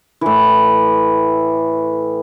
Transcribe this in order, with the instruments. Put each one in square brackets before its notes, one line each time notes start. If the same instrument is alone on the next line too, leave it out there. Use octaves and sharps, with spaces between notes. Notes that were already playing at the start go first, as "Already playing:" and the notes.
[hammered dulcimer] A2 E3